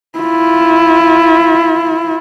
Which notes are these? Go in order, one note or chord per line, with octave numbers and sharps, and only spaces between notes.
E4 F4